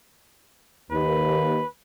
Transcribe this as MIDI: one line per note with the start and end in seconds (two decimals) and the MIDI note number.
0.91 1.58 39
0.91 1.67 71